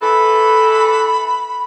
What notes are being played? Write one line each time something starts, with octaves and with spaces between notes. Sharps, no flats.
E3 A4 B5